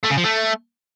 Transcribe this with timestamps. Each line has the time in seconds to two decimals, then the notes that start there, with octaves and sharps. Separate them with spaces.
0.03 A3
0.10 C#3
0.17 F3
0.24 A3